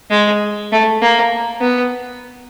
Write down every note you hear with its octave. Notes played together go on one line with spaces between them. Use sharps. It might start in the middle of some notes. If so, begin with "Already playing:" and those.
G#3
A3
A#3
B3